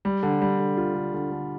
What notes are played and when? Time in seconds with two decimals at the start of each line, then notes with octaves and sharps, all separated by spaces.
0.05 G3
0.23 D3
0.42 G3
0.60 D3
0.77 F4
0.95 D3
1.14 D3
1.32 D3